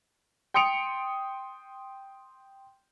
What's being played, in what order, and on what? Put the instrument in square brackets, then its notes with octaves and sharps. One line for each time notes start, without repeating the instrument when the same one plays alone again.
[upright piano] G5 C6 D#6 C#7 D7 F7